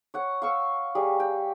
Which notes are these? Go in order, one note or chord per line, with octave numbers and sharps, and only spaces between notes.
C#5 F#5
F5 C#6 E6
G3 G#4
G5